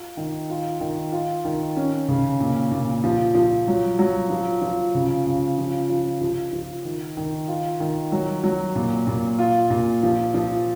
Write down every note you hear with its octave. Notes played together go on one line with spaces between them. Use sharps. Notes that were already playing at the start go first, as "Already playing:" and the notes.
Already playing: F4
D#3
F4
D#3
F4
D#3
C#4
C#3
A#2
A#2
F3
F3
F#3
F#3
F3
F3
C#3
C#3
F3
F3
F3
F3
D#3
D#3
F4
D#3
F#3
F#3
A#2
A#2
F4
A#2
F3
F3